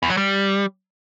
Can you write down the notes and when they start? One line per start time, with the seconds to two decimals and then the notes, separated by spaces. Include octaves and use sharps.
0.03 E2
0.10 F#3
0.17 G3